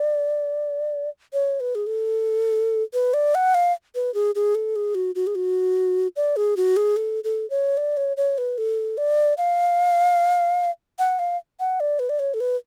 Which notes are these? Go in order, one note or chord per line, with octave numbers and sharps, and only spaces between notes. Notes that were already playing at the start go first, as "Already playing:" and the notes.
Already playing: D5
C#5
B4
G#4
A4
B4
D5
F#5
F5
B4
G#4
G#4
A4
G#4
F#4
F#4
G#4
F#4
D5
G#4
F#4
G#4
A4
A4
C#5
D5
C#5
C#5
B4
A4
D5
F5
F#5
F5
F#5
D5
B4
D5
C#5
A4
B4